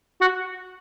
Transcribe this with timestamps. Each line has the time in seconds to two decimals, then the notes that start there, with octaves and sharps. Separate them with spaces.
0.21 F#4